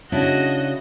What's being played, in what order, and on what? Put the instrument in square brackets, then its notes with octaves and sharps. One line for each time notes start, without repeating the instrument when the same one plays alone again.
[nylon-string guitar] C#3 D4 E4 [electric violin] F#4 D#5